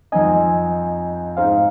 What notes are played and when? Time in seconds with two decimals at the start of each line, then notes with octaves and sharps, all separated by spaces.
0.12 F2 F3 C4 D#4 D#5 G#5
1.37 G#2 G#3 D#4 G#4 C5 F5